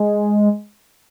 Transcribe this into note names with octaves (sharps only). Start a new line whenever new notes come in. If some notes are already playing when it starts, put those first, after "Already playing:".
Already playing: G#3